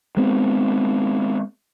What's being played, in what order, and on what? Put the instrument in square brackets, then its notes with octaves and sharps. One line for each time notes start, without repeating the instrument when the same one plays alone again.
[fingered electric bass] G#3 B3 C4